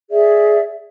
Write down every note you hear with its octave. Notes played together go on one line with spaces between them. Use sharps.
G#4 D5 E5